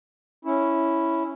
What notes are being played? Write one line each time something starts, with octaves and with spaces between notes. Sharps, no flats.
C#4 E4